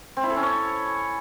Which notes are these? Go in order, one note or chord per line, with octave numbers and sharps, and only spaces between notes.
C4
E4
A4
C#4
C#5